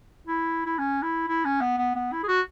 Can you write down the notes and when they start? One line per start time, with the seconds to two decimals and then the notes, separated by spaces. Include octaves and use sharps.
0.27 E4
0.66 E4
0.78 C#4
1.02 E4
1.28 E4
1.45 C#4
1.61 B3
1.78 B3
1.95 B3
2.12 E4
2.23 G#4
2.28 F#4